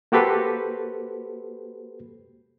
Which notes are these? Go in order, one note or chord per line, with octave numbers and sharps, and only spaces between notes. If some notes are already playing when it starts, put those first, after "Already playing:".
A#3 F#4 G4 A4 B4 C5